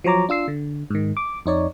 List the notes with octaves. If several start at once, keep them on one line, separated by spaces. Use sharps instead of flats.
F3 F#3 C#5 A#5 D6
D4 F4 E6 C7
D3
G#2 D#3
D6
F2 D#4 C#5 D5